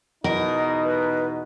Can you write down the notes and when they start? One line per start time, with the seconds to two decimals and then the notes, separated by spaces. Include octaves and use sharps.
0.24 E2 B2 D#4 A#4 D#5
0.83 B4